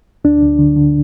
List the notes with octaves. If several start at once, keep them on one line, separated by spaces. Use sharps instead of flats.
D2 D4
D2
D3
D3